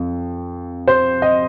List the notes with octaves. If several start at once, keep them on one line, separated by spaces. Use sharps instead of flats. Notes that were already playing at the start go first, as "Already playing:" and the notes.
Already playing: F2
C5
D#5